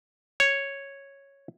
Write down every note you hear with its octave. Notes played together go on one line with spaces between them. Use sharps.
C#5